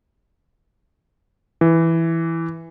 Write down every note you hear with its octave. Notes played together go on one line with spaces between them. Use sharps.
E3